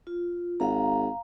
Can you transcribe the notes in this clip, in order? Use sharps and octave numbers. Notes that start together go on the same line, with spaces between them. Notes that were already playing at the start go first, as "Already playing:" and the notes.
F4
G#1 F5 A#5